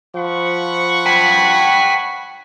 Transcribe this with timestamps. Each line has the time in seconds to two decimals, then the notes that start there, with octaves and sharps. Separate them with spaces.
0.16 F3 F#5 B5 C#6
1.06 G5 A5 B6